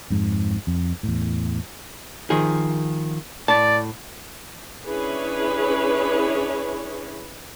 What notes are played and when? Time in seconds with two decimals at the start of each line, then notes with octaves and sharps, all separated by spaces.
0.10 F2 G#2
0.67 F2
1.03 E2 A2
2.30 D#3 F3 G#4
3.48 A2 D5 A5
4.83 C#4 D4 E4 G#4 B4 C#5